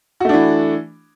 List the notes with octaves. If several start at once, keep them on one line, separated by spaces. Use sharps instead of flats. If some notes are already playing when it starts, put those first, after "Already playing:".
E3 A3 D4 F#4